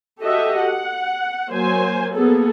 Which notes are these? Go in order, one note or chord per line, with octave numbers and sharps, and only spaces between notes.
F#4 G4 A4 D#5 E5
F#5
F#3 A#3 C5 G#5
A#3 B3 G#4 A4